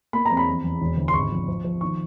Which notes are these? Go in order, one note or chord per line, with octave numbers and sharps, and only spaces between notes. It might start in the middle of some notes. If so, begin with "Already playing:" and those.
A#3 B5
F2 A#5
B5
E2
E2
E1
D2
C6
G#1 C#6
F3
F3
F3
D#3 C#6